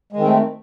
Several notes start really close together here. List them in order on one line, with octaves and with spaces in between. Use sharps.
G#3 D#3 C4 A3